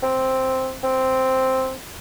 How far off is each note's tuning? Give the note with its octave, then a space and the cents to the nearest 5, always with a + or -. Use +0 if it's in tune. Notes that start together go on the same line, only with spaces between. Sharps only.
C4 +0
C4 +0